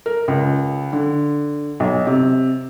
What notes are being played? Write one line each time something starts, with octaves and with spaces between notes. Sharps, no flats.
A#4
C#2
D3
B1
C3